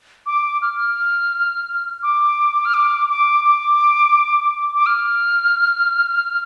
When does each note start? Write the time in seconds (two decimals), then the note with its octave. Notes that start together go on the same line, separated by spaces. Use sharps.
0.26 D6
0.62 F6
0.76 F6
2.03 D6
2.65 F6
2.74 D6
3.09 D6
3.44 D6
4.75 D6
4.86 F6